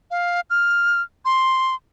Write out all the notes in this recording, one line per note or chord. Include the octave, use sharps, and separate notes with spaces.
F5
F6
C6